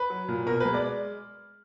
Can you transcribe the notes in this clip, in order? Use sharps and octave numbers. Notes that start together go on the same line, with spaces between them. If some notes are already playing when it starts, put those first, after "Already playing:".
Already playing: B4
F#3
A#2
B2 A#4
G#3 B4
D5